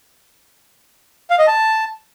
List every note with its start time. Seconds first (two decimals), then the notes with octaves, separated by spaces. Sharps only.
1.30 F5
1.39 D#5
1.47 A5